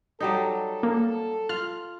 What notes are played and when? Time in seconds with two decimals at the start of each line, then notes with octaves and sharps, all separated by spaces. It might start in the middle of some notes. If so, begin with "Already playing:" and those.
0.20 F#3 G3 D#4 A4
0.83 A#3
1.49 F4 F6